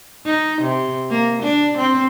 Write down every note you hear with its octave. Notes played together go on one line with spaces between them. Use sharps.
D#4
C3
A#3
D4
C4